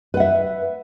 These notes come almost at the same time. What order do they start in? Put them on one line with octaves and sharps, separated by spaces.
B4 F#5 E5